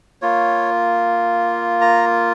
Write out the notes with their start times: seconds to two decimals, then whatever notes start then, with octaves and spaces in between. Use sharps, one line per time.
0.22 A#3 F4 C#5
1.81 A#5